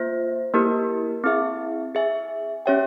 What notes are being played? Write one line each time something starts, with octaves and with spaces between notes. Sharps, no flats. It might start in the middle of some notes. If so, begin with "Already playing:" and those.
Already playing: A#3 F4 C5 E5
A#3 E4 G4 A#4
C4 E4 G#4 E5
G#4 E5 G#5
C#4 G4 C#5 E5 G5